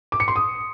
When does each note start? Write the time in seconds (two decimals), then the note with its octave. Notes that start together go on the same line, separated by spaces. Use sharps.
0.12 D6
0.20 C#7
0.28 C6
0.36 D#6